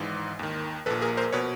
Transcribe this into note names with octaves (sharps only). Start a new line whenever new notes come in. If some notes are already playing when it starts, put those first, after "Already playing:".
Already playing: G#1 G#2 E3
D#2 D#3
A#1 A#2 A4 B4
G#4 A#4
A#4 C5
B2 B4 C#5